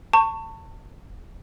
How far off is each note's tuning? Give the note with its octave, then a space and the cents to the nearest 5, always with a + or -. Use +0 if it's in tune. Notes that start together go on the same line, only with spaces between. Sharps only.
A5 +30 C#6 +0